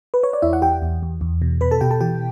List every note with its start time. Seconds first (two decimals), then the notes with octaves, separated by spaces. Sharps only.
0.14 B4
0.23 C#5
0.33 D5
0.42 E2 E4 E5
0.53 F#5
0.62 E2 G4 G5
0.82 E2
1.03 E2
1.21 E2
1.42 B2
1.61 B2 B4 B5
1.71 A4 A5
1.81 B2 G4 G5
1.91 A4 A5
2.01 E3 G4 G5